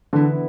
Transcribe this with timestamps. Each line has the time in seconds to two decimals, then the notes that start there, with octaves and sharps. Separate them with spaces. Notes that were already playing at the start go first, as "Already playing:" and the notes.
0.13 D3 E3 B3 E4